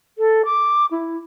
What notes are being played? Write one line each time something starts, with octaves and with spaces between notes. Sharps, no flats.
A4
D6
E4